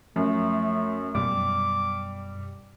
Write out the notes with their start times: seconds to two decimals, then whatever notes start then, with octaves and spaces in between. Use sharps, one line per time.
0.16 F#2 F3 A3
1.15 F#2 B2 G3 D6